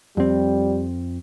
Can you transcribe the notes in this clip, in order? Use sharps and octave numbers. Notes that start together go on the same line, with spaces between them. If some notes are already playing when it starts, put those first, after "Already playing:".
F2 G3 C4